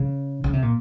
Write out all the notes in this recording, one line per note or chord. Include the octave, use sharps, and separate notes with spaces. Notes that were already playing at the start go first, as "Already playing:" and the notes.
Already playing: C#3
C#3
C3
A#2